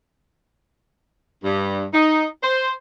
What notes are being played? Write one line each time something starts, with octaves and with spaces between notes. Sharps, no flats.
G2
D#4
C5